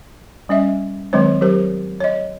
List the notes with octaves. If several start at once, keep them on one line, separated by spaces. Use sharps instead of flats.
G3 C#4 D#5 E5
D#3 F#3 G#3 C4 C5 C#5
F#3 G4 A#4 C5
C#5 D#5